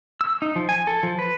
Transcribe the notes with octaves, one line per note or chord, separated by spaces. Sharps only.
E6
D#4
F3
G#5
A4
F3
B4